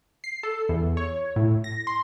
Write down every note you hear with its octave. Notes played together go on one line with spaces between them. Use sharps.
C7
A4
E2
C#5
A2
A#6
C6